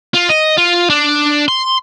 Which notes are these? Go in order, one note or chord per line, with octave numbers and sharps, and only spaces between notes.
F4
D#5
F4
D4
C6